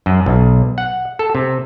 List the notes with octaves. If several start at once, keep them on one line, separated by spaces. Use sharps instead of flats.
F#2
B1
F#5
A4
C3